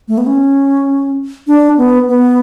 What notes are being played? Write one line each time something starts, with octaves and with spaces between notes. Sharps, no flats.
A3
B3
C#4
D4
B3
B3